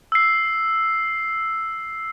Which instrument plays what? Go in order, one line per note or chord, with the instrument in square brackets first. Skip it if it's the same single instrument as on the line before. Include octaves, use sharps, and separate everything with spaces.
[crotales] E6 C7